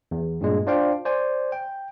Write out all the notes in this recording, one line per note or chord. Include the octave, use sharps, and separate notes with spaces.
E2
G2 A#2 G#3
D4 F4 C5 D5 F5 G5
C5 D5 G#5
G5